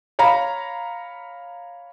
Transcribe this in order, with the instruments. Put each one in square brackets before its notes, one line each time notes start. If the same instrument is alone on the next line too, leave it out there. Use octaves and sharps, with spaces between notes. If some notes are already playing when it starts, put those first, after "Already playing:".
[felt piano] C#5 F5 A#5 B5